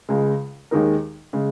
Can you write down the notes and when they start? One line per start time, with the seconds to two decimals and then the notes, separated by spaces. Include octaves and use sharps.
0.09 C#2 C#3 G#3
0.71 D#2 D#3 G#3 D#4 A#4
1.33 C#3 G#3